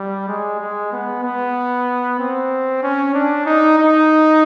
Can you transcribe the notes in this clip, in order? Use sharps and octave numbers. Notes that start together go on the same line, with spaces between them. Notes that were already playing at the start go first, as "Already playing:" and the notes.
Already playing: G3
G#3
G#3
B3
B3
C4
C#4
D4
D#4
D#4